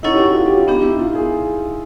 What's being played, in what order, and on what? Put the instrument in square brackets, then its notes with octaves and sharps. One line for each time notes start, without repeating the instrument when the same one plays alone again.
[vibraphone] C#4 E4 A4 C#5 F#5 [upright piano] D#4
[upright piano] G4
F#4
F4
G4
F4
[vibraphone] B3 D4 G4 [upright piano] D#4
[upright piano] E4
F4
G#4